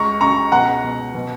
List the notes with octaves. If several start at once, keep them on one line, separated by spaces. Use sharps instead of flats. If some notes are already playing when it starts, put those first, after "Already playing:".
Already playing: C#2 A#5 C#6
C#3 A#5 C#6
B2 F#5 A#5
B2
B2